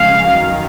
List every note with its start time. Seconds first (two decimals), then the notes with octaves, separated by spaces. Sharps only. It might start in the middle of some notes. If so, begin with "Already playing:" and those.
Already playing: C#3 F3 G#3 C#4 F5
0.27 F#2 D#3 F#3